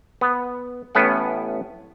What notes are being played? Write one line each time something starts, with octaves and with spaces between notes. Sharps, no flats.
B3
A1 A2 B3 C#4 F#5